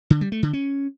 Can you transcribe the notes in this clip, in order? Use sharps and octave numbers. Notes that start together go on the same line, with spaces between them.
D3
G3
A3
D3
C#4